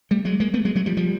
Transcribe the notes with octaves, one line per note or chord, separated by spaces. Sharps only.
G3 A3
F#3 G#3
G#3 A#3
A3 B3
F#3 G#3
F#3 G#3
F3 G3
F3 G3